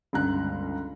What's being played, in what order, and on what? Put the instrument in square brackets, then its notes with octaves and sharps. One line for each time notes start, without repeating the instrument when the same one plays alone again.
[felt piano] G1 C#2 A#5 F#6